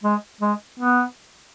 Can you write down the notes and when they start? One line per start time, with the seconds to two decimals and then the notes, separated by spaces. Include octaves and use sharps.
0.03 G#3
0.41 G#3
0.79 B3